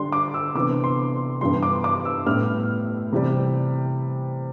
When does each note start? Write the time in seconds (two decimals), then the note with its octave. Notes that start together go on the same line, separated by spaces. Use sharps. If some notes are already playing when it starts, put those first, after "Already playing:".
Already playing: D3 G3 D4 C6
0.12 D6
0.34 E6
0.55 C3 E3 B3 D4 D6
0.84 C6
1.41 G2 E3 G3 B3 C6
1.63 D6
1.84 D6
2.05 E6
2.26 A2 G3 B3 F6
3.12 C3 E3 G3